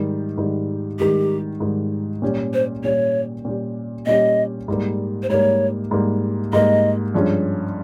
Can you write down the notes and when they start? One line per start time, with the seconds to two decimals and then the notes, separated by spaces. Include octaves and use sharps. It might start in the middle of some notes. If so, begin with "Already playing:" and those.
Already playing: G#2 D#3 G3
0.38 G#2 D#3 G3
0.99 G#2 D#3 G3 G4
1.60 G#2 D#3 G3
2.22 A#2 G3 C#4 G4
2.54 C5
2.84 A#2 G3 C#4 G4 C#5
3.45 A#2 G3 C#4 G4
4.06 A#2 G3 C#4 G4 D#5
4.68 G#2 G3 A#3
5.23 C5
5.30 G#2 G3 A#3 C#5
5.91 G#2 G3 A#3
6.53 G#2 G3 A#3 D#5
7.14 G2 F3 G#3 C#4